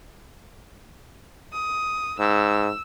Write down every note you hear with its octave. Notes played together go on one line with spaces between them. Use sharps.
D#6
G#2 E6